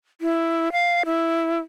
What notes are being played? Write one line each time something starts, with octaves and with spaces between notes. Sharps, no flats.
E4
F5
E4